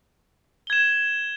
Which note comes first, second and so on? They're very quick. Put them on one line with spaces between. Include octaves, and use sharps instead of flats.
G7 G#6 E7